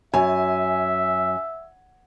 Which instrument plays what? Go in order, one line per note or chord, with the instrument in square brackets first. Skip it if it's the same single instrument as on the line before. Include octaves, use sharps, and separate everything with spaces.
[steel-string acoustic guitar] F#2 [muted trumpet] E5 [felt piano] G#5